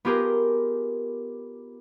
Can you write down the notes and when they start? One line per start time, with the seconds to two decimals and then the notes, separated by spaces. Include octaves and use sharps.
0.05 B3 F4 G4 G#4 A#4